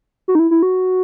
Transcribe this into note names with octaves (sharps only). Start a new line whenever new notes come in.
F#4
D#4
E4
E4
F#4